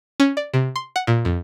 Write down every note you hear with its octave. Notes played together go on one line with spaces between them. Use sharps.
C#4
D5
C3
C6
F#5
A#2
F2